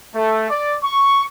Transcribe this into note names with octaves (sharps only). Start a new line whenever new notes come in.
A3
D5
C#6